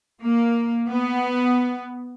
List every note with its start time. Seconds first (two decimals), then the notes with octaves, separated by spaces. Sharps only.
0.23 A#3
0.90 B3